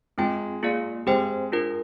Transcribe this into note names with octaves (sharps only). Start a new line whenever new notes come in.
G#3 C4 F4 G#4 D#5 G5
A#3 F4 G#4 D5 F5
G#3 C4 G4 C5 G5
D4 F4 A#4